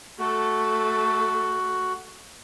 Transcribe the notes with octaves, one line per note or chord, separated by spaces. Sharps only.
A3 F#4 A4